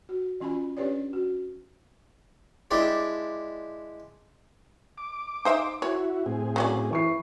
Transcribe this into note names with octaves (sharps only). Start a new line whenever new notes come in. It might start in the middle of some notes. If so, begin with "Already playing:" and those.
F#4
E3 C#4 F4 G#5 B5
C#4 D4 G4 B4 C#5 D5
F#4
G#3 C4 D4 E4 G4
D6
D#4 C5 E5
E4 F#4 C#5
A2 C4 G#4
F#3 C#4 D5
E3 C#6 C7